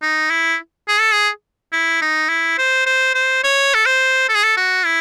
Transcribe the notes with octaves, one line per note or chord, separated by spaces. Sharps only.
D#4
E4
G#4
A4
G#4
E4
D#4
E4
C5
C5
C5
C#5
A4
C5
A4
G#4
A4
F#4
E4